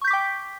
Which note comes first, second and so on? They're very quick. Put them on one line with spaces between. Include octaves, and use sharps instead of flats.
C#6 G6 B6 D6 G5